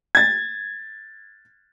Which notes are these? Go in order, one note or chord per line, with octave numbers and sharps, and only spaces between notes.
G#6 A6